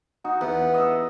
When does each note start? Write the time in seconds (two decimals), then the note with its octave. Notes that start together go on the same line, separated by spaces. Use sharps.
0.25 D#4 F#4
0.41 E2 B3
0.74 D#5 E5